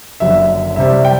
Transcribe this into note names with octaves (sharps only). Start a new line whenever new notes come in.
F#1 F#2 D3 E5
C2 C3 G3 E5
G5